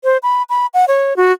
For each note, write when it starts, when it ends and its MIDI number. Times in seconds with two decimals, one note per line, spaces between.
0.04 0.17 72
0.23 0.43 83
0.49 0.66 83
0.74 0.85 78
0.88 1.16 73
1.17 1.32 66